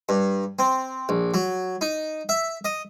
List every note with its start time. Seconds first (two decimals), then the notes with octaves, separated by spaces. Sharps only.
0.09 G2
0.59 C4
1.09 A#1
1.34 F#3
1.81 D#4
2.29 E5
2.65 D#5